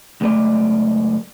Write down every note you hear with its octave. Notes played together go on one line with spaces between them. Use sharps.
C#2 F#2 A3 D5